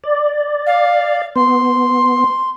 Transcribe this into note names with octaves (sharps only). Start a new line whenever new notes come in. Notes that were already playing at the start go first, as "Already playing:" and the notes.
D5
F5
B3 C6